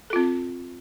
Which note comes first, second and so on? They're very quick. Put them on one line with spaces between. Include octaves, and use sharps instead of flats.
A4 F4 C4